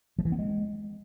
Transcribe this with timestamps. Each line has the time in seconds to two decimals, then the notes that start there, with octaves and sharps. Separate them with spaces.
0.19 F3
0.25 E3
0.32 B3
0.39 G#3